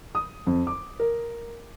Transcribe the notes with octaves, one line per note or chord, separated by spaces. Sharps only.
D#6
F2
D6
A#4